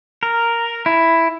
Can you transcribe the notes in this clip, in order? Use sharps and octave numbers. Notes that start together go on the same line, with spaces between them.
A#4
E4